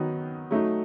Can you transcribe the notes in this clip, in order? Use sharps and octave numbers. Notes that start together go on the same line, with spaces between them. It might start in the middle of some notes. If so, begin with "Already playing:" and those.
Already playing: D#3 F#3 B3 D#4
F#3 A3 D#4